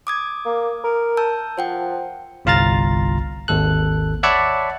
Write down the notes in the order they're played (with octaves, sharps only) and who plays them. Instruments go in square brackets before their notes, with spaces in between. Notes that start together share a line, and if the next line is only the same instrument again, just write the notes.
[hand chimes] D6 D#6 G#6
[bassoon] A#3
A#4
[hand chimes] A5 E6 G6
[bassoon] F3 [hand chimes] C5 F#5 G5
[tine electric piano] G1 C2 F4 F5 A#5 A6
G#1 D#2 A4 F#6
C#5 D5 E5 F#5 A5 B5